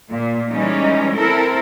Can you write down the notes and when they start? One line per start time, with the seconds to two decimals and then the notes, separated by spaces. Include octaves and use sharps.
0.12 A#2
0.50 E3 G3 G#3 C#4 D#4
1.15 C4 E4 A4 A#4